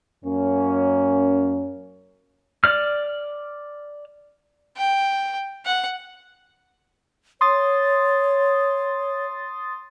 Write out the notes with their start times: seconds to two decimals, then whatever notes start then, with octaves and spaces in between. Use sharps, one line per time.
0.24 F#2 A#3 C#4
2.64 D5 F6
4.77 G5
5.66 F#5
7.41 C#5 C6 D#6 A6